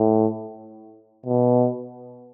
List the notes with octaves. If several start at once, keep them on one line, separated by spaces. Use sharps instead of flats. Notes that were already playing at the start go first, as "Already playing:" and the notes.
Already playing: A2
B2